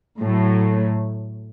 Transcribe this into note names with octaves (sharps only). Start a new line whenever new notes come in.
A2 F#3 A3